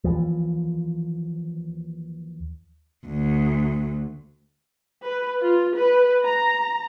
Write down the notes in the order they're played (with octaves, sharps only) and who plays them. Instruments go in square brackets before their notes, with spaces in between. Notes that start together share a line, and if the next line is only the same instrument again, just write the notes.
[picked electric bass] D#2 E3 F3
[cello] D2
[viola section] B4
F4
B4
A#5